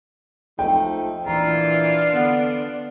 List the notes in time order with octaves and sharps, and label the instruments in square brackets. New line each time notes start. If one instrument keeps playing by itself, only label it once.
[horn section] F3 A3 D#4 [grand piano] G5
[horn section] A#2 E3 [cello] D4 [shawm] F4 [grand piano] A#5
[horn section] D3 B3